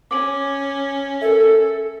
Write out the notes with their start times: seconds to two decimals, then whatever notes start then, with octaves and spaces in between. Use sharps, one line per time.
0.11 C#4 D6 F#7
1.22 A4 A#4 E5